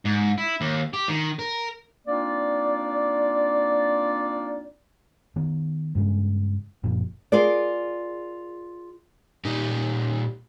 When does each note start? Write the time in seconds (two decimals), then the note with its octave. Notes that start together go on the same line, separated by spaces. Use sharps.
0.05 G#2
0.38 E4
0.61 D#2
0.93 G4
1.09 D#3
1.39 A#4
2.07 A#3 C4 D4 D#4 F4 D5
5.36 D#3 B3
5.95 G2 C#3 G#3
6.84 F#1 A#2 F3
7.32 F4 G#4 A#4 D5
9.44 A#2 D#4 G4